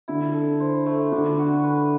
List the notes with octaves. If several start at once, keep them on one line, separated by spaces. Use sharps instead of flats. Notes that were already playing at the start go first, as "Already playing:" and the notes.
D3 E4
A4
C5
A3
D3 D4
F#4
B4